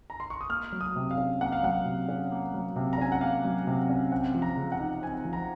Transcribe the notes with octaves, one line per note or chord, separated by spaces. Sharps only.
A#5
C6
C#6
D#6
A#3 F6
F#3
D#6
C3
F5
C#4
A#3 F#5
F5
F#3 F#5
C3
C#4
A#3
F#3
C3
A#5
C#4 G#5
F#5
A#3 F5
F#3
C3
C#4
C4 F#5
F3
A#5
C#3
F#5
D#4
C4 G#5
F3
A#5